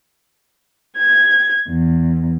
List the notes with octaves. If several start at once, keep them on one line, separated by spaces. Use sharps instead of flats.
G#6
E2